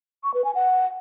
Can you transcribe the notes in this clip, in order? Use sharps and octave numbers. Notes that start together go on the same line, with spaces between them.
C#6
B4
G#5
F#5